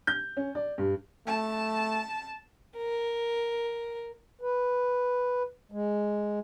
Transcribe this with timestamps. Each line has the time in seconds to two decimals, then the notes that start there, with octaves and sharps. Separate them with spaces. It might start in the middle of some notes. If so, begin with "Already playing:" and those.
0.07 G6
0.37 C#4
0.55 D5
0.78 G2
1.27 A3 A5
2.76 A#4
4.41 B4
5.72 G#3